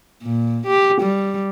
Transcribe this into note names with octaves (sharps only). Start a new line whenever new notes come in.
A#2
G4
G3